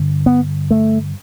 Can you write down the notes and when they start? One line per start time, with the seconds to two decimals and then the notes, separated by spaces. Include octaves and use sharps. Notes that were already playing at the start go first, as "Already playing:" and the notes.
Already playing: G2 D3
0.26 B3
0.71 A3